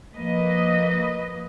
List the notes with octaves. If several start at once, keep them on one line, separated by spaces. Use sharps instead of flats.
F3 A#3 B4 D#5